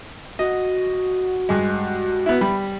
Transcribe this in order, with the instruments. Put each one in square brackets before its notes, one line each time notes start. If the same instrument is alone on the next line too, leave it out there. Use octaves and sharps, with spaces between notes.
[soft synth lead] F#4 [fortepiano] D#5
[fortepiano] G2 G#3
B3 E4
[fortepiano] G3 [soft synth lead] B5